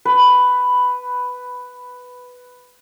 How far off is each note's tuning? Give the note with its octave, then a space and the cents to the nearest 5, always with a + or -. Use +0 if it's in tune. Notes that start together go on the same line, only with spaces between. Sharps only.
B4 +5